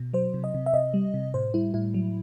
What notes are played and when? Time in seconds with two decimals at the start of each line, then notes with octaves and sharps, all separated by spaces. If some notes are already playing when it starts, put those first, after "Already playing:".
Already playing: B2
0.13 F#3 C5
0.34 C3
0.44 D#5
0.54 C3
0.66 E5
0.73 C3 D#5
0.94 G3
1.14 C3
1.34 A2 C5
1.54 G3 E4
1.74 A2 E4
1.94 F#3